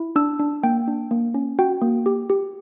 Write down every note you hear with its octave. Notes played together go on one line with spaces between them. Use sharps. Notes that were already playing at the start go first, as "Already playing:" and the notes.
Already playing: E4
D4 E6
D4
A#3 G5
D4
A#3
C#4
F#4 G5
A#3
G4
G4